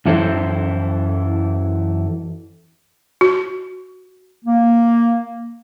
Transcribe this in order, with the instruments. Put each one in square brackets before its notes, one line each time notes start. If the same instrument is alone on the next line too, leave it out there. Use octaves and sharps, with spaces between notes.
[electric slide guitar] F#2 E3 E4 A4 C5 G5
[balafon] F#4
[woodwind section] A#3